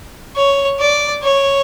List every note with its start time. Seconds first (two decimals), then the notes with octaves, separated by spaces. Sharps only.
0.36 C#5
0.80 D5
1.23 C#5